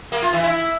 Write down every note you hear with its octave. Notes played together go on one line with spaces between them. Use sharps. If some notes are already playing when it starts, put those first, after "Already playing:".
A#3
F4
E3
E4